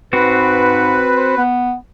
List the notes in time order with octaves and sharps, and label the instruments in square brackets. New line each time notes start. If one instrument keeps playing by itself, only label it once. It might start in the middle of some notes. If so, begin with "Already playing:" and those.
[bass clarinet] G#2 [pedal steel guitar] C4 F#4 [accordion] B4
[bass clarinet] C5
B3